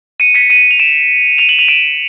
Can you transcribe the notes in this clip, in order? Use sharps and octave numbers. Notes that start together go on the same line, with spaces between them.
C#7 D#7
B6 C#7
C#7 D#7
F7
D7 E7
D#7 F7
E7 F#7
D#7 F7
D7 E7